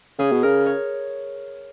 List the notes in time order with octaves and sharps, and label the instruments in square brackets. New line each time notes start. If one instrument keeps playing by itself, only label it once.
[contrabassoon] C#3 [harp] G#4
[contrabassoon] B2
[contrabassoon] C#3 [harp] A#4
[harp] C#5